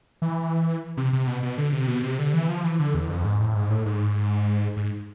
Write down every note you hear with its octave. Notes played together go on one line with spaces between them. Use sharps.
E3
C3
C3
B2
B2
D3
C3
B2
C3
D3
E3
F3
E3
D3
E2
F2
G#2
A2
G#2
A2
G#2
G#2